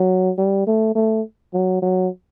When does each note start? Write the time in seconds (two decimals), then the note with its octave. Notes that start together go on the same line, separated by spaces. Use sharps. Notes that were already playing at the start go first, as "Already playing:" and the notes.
Already playing: F#3
0.38 G3
0.67 A3
0.95 A3
1.53 F#3
1.82 F#3